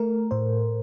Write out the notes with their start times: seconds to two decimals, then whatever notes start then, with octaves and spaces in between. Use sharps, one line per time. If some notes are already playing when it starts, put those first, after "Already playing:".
Already playing: A3 A#4
0.31 A2 C5